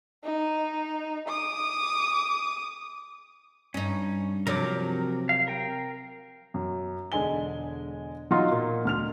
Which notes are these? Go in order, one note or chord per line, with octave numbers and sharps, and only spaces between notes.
D#4
D6 D#6
G2 C#4 D#4
C3 F3 F#3 A#4 D6
F5
A#4 G5
F#2
E1 D3 G#3 G#5 G7
F#3 D#4 F4 F#5 C6
A#2
D2 F6 F7